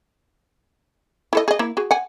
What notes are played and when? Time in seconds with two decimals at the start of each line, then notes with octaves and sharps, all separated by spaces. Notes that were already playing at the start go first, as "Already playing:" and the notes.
1.33 E4 A4 D#5
1.48 G#4 D#5
1.59 A#3 E4
1.77 F#4 G#4
1.91 F#5 G#5